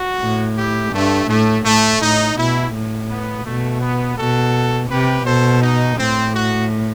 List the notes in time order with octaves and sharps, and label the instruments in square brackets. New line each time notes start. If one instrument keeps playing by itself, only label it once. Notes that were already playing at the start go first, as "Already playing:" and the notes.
Already playing: [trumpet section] F#4
[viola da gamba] A2
[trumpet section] E4 G4
[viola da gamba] G2 [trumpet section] A3
[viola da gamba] A2 [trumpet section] A3
[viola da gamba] A2 [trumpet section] A3
[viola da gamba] A2 [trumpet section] D#4
[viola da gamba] B2 [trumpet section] E4
[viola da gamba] A2
[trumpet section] B3
[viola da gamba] B2 [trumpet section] A3
[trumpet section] B3
[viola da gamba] B2 [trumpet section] F#4 A4
[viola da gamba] C3 [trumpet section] G4 B4
[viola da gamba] B2 [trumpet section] A4 C5
[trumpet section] D#4
[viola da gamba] A2 [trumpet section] C4
[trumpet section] F#4